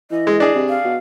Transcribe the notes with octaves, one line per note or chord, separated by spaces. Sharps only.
E3 D#5
G#3
D4 G#4
C3
F5
B2